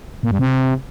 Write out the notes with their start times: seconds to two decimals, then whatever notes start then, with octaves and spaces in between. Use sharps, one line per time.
0.23 A#2
0.31 G2
0.39 C3